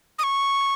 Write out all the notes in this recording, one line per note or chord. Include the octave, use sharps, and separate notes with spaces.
D#6
C#6